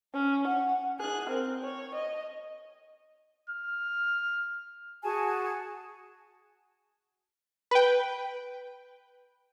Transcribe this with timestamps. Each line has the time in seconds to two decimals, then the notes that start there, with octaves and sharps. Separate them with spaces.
0.14 C#4
0.47 F#5
1.00 G#4 F#6
1.29 C4 A#4
1.63 C#5
1.94 D#5
3.50 F6
5.04 F#4 G#4 G#5 A5
7.71 B4 G5